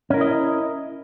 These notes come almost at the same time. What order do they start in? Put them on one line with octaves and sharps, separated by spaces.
C#4 A#4 E4 D#5